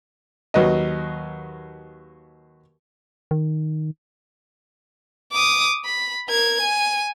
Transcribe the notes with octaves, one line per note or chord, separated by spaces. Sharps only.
D#2 F#3 B4 D#5
D#3
D6 D#6
B5
A#4 G#6
G#5